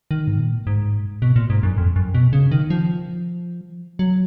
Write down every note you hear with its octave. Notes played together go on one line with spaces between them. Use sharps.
D#3
G#2
A#2
G#2
B2
A#2
G#2
F#2
F2
F#2
B2
C#3
D#3
F3
F#3